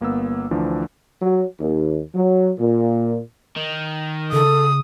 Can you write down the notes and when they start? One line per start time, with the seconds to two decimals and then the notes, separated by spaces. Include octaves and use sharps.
0.01 G1 A#3 B3 E6
0.51 D2 E3 F3 D4
1.22 F#3
1.60 D#2
2.15 F#3
2.59 A#2
3.56 D#3
4.33 C#3 A4 D#6